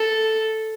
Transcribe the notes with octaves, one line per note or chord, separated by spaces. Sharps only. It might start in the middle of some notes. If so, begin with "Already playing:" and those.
Already playing: A4